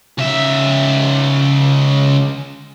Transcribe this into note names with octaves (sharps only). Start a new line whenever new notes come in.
C#2 E5